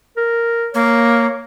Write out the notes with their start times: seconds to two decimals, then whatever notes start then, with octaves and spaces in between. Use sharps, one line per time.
0.17 A#4
0.74 A#3 C#5